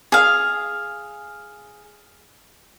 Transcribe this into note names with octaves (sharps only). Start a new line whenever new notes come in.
G#4 F5